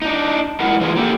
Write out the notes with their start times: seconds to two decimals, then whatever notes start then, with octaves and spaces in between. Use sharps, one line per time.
0.02 D4 D#4
0.60 G2 F#3 G#3 E4 A#4 F#5
0.80 E3 F4 G#4
0.96 A#3 G4 A4